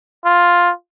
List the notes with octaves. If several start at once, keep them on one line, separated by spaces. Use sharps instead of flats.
F4